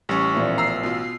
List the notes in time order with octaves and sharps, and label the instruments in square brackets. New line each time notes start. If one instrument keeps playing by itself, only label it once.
[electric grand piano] A1 [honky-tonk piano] G3 C#4 [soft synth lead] C#6
[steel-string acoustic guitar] E2 A#2 F3
[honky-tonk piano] A#5 E6 [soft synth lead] C7
[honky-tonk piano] B2 F4